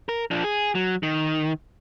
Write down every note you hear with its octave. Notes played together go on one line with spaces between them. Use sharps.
A#4
F3 D4
G#4
F#3
D#3